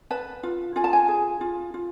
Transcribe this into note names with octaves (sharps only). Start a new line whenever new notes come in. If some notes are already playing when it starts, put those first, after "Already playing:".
B4 A5
F4
F4 G#5
A5
G#5
G#4
F4
F4